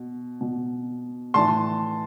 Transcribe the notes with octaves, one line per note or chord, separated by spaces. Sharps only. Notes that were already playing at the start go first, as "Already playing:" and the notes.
Already playing: B2
B2
A2 E3 A5 C6